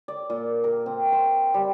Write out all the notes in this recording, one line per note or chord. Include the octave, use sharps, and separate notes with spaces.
D5
A#2
A#4
C4
C5
G3